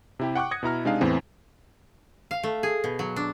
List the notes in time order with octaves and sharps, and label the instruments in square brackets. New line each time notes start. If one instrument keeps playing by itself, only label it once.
[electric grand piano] C3 E4 G4
F#5 G5 C#6 D6 F#6
D#6 G#6 A#6 C#7
B2 E4 A#5 F6
C3 G#3 D4 D#4 G#4 F5
E2 A2 E3 C4
[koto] F5
A3
G#4
B2
F#3
D4